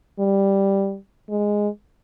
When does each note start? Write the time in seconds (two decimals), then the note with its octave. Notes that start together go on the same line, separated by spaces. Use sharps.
0.19 G3
1.30 G#3